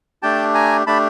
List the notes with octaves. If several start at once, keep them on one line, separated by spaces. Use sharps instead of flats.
A3 D4 G4 G5 A5
G#5 A#5
A3 D4 G4 A5 B5